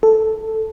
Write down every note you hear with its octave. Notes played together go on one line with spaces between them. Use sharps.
A4